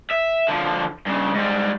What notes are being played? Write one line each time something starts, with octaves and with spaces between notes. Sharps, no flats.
E5
D3 F3
G2 C#3
G#2 G3